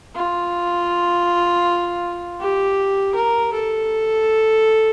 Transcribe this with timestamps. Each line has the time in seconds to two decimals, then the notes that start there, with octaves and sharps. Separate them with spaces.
0.15 F4
2.40 G4
3.15 A#4
3.53 A4